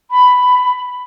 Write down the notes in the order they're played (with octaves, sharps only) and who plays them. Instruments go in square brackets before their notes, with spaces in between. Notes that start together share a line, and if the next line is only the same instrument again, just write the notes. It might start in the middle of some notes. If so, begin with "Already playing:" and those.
[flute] B5